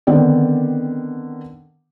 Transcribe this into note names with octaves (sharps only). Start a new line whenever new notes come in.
D3 D#3 B3 C4 D5